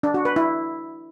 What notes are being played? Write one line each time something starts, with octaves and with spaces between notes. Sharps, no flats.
D4
F#4
B4
E4